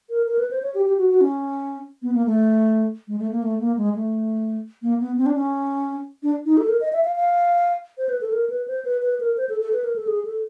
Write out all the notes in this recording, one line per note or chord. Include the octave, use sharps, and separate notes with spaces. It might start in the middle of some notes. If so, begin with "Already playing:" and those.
A#4
A#4
B4
C5
C#5
G4
G4
F#4
F#4
C#4
B3
A#3
A3
G#3
A3
A#3
A3
A#3
G#3
A3
A#3
B3
C4
D4
C#4
D4
D#4
A4
A#4
D#5
E5
F5
F5
C5
B4
A4
A#4
B4
C5
B4
B4
A#4
C5
A4
A4
B4
A#4
A4
G#4
A4